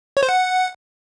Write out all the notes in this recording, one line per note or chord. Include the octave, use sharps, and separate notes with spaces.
C#5
C5
F#5